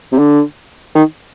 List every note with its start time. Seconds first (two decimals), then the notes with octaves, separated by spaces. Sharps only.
0.12 C3
0.19 D3
0.95 D#3